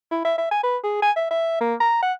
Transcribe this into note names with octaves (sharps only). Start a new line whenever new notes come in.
E4
E5
E5
G#5
B4
G#4
G#5
E5
E5
A#3
A#5
F#5